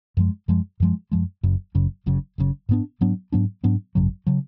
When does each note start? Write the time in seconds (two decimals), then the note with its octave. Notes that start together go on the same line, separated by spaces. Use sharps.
0.17 F#2 F3 G#3
0.48 F#2 F3 G#3
0.80 F#2 F3 G#3
1.12 F#2 F3 G#3
1.43 F#1 F#2 C#3
1.75 F#1 F#2 C#3
2.06 F#1 F#2 C#3
2.38 F#1 F#2 C#3
2.69 G#2 F#3 B3 D4
3.01 G#2 F#3 B3 D4
3.32 G#2 F#3 B3 D4
3.64 G#2 F#3 B3 D4
3.95 G#1 F#2 C#3 F#3
4.27 C#3 F#3